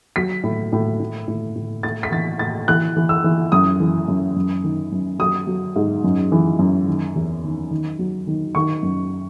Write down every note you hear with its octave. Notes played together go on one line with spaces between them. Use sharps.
F#3 B6
A2
A2
A2
A2
A2
A2 A6
B6
E3 A6
A2 A6
E3 F#6
E3
E6
E3
F#2 D#6
E3
F#2
F#2
D#3
F#2
F#3 D#6
F#3
G#2
F#2
E3
F#2
D#3
E2
D#3
D#3
F#3
D#3
D#3 C#6
F#2